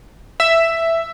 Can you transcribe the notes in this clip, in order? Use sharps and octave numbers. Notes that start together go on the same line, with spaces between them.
E5